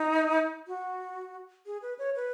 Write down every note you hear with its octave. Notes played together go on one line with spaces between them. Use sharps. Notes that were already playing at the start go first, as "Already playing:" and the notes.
Already playing: D#4
F#4
G#4
B4
C#5
B4